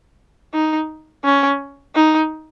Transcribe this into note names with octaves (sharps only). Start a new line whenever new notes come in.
D#4
C#4
D#4